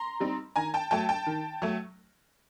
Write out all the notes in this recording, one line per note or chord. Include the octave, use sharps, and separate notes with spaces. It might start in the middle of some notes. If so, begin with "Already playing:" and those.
Already playing: A#5 C6
G3 C4 D#4
D#3 G#5 A#5
G5 A5
F#3 A3 G5 A5
G5 A5
D#3
F#3 A3